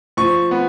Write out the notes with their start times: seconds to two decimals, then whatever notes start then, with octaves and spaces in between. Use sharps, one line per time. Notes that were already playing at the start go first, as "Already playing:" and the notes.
0.17 F3 C#6
0.51 B3